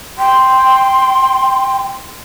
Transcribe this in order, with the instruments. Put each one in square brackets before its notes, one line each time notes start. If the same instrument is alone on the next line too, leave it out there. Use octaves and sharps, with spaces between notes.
[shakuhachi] G5 [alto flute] C6